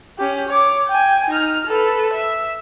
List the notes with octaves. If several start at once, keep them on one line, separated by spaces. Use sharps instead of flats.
C#4 G4
C#5 D6
G5 G#5
D#4 F6
A4 B4
E5